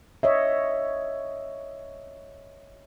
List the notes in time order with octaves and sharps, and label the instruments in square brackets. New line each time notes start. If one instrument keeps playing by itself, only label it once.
[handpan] C#5 D#5 E5